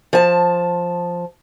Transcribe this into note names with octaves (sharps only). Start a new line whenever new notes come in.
F3 A5